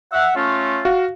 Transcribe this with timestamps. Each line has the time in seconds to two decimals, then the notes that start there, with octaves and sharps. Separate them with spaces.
0.13 E5 F#5
0.36 A3 C#4 F4
0.85 F#4 F5